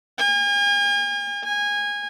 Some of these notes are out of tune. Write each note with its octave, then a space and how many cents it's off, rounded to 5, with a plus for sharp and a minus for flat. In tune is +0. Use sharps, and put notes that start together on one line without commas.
G#5 -40
G#5 -20